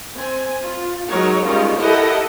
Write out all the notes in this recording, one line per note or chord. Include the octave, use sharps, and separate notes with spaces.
C4 G#5
F4
F#3 G#3 D#4 A#4 C#5
D#3 G3 G#3 C#4 D#4 F4
E4 G4 A4 A#4 D#5 F#5